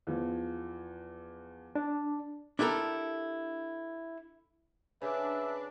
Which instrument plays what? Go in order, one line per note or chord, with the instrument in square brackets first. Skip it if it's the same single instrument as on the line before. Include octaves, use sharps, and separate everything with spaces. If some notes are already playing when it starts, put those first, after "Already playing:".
[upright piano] E2 F3
[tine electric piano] D4
[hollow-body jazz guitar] D4 E4 G4 A4 A#4
[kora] C#3 [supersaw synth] D4 [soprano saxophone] B4 [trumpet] E5